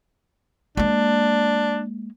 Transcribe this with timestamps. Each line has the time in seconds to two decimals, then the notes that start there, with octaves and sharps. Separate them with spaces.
0.77 G#3 A#3 D4